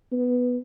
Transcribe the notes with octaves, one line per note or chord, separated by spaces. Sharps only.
B3